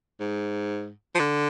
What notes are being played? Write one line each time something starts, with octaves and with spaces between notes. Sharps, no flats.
G#2
F3
D3